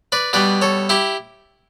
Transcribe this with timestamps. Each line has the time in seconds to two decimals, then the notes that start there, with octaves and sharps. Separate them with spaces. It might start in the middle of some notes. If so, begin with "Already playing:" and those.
0.12 B4 D5
0.33 B2 G3 B4 D5
0.62 A4 C#5
0.89 E4 G4